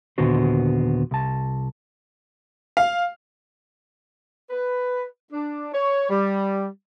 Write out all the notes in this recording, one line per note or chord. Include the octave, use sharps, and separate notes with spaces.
D#2 A#2 D3 B3 F#4 C5
C2 A5
F5
B4
D4
C#5
G3